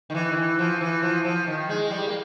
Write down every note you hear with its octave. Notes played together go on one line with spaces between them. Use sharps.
D#3
E3
D#3
E3
F3
E3
F3
F3
D#3
G#3
G3
A#3